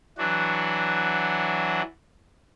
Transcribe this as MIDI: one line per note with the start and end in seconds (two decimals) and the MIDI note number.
0.18 1.82 52
0.18 1.82 54
0.18 1.82 62
0.18 1.82 66